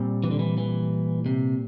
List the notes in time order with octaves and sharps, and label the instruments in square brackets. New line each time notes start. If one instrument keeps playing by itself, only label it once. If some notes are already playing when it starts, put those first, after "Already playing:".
Already playing: [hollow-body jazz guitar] A#2 G3 C4
[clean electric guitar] E3
D3
E3
E3
C3